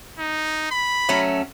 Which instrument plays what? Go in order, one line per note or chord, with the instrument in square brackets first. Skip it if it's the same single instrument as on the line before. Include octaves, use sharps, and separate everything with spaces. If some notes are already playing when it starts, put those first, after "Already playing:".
[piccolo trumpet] D#4
B5
[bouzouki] F#3 A3 C#4